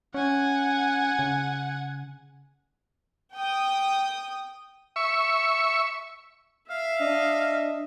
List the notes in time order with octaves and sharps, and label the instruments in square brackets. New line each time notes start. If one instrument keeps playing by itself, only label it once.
[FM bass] C#4 [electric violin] F#5 G#5
[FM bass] C#3
[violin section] G5 D#6
[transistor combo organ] E5 C#6
[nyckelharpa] E5 [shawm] F5
[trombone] D4 [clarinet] D#5